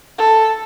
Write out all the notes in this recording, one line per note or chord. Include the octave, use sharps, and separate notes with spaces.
A4